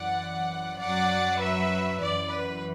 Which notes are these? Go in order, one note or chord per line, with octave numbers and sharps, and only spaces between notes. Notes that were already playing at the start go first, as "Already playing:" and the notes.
Already playing: F#2 E3 D5 F#5
F#2 F#3 D5 F#5
B4 E5
F#2 E3 D5
B4